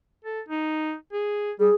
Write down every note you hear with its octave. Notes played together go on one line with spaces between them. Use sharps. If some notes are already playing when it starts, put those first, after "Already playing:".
A4
D#4
G#4
G3 G#4